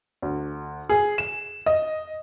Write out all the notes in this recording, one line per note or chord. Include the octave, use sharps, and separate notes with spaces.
D2
G#4
E7
D#5